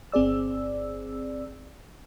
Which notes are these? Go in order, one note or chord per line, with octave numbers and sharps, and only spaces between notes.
G1 C4 G#4 D5 E6